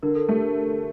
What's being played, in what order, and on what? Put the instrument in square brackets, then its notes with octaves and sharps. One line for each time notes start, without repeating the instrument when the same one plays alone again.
[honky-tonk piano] D3 [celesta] A#4
[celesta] A4
[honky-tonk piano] A3 [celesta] G4
[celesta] A#4